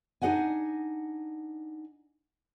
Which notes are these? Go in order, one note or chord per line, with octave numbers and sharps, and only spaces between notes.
D4 D#4 G#4 D#5 F#5 G#5